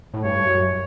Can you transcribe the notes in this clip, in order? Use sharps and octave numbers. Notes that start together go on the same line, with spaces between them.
A2
G2 C#5
F#2